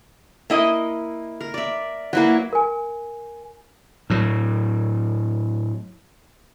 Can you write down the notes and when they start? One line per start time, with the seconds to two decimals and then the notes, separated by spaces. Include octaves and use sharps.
0.50 A#3 E4 D#5
1.41 A#4
1.54 D5 E5
2.13 F#3 A#3 E4 B4
2.53 A#4 G#5
4.10 A2 F#3